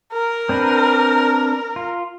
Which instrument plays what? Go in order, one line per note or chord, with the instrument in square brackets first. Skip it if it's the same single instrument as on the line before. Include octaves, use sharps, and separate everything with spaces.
[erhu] A#4
[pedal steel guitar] C4 D4 B4
F4